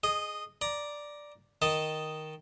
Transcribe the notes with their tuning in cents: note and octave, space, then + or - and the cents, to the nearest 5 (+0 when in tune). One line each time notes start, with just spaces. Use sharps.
G#4 +5 D#5 -10
D5 +0 A#5 +15
D#3 +0 D#5 +0 A5 +0